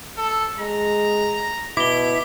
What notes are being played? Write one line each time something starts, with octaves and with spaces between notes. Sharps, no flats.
A4
G#3 A#5
B2 E4 D6 G7